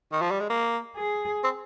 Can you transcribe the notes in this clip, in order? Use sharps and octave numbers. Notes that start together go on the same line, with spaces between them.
D#3
F3
G3
G#3
A#3
G#4
C4